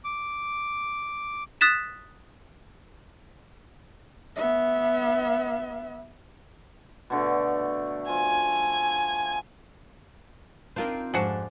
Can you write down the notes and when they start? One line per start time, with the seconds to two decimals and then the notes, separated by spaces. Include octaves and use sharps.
0.05 D6
1.61 D#6 F#6 A6 B6 E7
4.36 B3 E5
7.10 B2 D3 A3
8.09 F3 G#5
10.76 C4 D4 D#4 F4 A#4
11.14 F2 G#2 F3 D4 F#4 G#4 A4